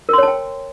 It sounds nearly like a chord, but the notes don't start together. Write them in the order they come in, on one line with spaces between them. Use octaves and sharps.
A#4 C6 C#5 A5 G5